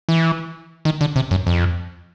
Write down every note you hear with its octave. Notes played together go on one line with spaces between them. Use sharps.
E3
D#3
D3
C3
F#2
F2